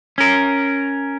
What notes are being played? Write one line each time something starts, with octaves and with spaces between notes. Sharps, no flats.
C#4 A#4